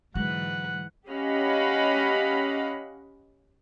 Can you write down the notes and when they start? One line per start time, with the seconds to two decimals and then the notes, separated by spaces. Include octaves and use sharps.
0.15 G#2 D3 E3 F#3 G#3 B4 F#5
1.08 C#4 G4 D#5 F5 F#5 B5